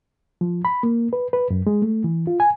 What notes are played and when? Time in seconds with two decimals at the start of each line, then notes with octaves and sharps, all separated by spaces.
0.41 F3
0.65 B5
0.83 A#3
1.13 B4
1.33 B4
1.50 F#2
1.67 G#3
1.82 A3
2.04 E3
2.27 F4
2.40 G#5